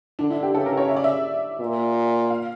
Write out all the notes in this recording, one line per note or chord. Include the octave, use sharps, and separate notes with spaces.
D3 D4
E4
G4
C#3 A4
A#4
C#5
E5
D5
E5
A#2
F5